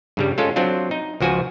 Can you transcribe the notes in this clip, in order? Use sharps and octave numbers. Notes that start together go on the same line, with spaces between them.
G2 C#3 G3
G#3 C#4 F4 A4
F#3 C4 D4 F4
D#4
C#2 F3 F#4 G#5